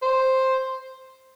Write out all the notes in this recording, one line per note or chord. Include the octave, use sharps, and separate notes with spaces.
C5